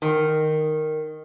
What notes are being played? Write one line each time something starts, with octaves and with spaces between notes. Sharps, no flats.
D#3